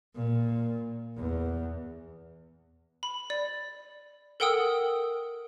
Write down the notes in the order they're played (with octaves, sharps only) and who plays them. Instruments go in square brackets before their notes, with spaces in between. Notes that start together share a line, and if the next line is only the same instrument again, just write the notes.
[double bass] A#2
E2
[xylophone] B5
D5
A4 A#4 F#5 G5 D#6 E6